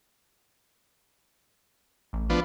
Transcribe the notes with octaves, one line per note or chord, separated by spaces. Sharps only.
A1
F3 B3 D4